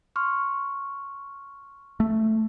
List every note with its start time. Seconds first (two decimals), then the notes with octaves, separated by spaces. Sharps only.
0.16 C6 C#6 F6
2.00 A3